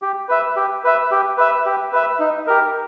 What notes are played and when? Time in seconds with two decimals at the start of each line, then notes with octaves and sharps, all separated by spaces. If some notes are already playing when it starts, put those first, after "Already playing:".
0.02 G4
0.29 B4 E5
0.57 G4
0.84 B4 E5
1.11 G4
1.38 B4 E5
1.66 G4
1.93 B4 E5
2.20 D#4
2.47 G4 A#4